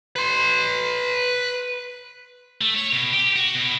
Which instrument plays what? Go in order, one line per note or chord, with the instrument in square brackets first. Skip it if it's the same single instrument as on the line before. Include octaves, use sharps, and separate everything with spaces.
[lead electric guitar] B4 C6
[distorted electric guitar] A3
C#5
B2
G4
F#4
B2